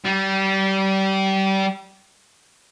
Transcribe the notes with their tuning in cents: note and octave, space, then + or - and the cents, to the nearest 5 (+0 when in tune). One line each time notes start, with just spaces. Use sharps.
G3 -25